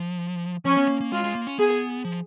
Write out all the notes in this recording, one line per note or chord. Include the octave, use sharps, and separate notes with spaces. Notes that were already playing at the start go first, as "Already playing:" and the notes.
Already playing: F3
F3 C#4
B3
A#3
A#3
G#3 F4
G#3
A#3
C#4
B3 G#4
F3